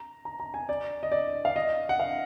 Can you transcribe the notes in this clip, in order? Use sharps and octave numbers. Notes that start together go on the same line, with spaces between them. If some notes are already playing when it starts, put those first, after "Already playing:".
Already playing: A#5
A#5
A#5
G#5
D5
D#5
D5
F5
D#5
F#5
F5